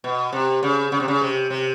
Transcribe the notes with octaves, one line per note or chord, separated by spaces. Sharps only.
B2
C3
C#3
C#3
C3
C#3
C3
C3